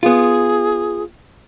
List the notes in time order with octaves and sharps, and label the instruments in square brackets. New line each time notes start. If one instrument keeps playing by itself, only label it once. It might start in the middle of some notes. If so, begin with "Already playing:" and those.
[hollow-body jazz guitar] B3 F4 [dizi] G#4